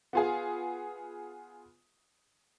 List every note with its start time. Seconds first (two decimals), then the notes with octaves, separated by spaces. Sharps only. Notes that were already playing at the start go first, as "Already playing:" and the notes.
0.13 B3 F4 G#4